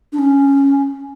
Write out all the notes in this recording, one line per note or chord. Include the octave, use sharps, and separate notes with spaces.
D4
C#4